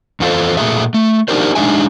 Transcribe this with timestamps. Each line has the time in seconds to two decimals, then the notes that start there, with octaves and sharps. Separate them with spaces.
0.20 E2 B3 F4 A4 C5
0.57 A#2 E3 A3 G#4 E5
0.94 A3
1.28 D4 D#4 G4 A#4 C5
1.55 G#3 D4 D#4 G#4 E5 G#5